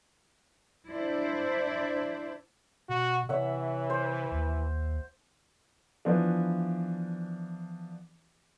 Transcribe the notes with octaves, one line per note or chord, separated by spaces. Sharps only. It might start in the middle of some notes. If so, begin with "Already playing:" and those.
D4 E4 C5 D5 E5
B2 F#4
C3 E3 C#5 E5 F#5
C5
D#2
E3 F3 B3 D4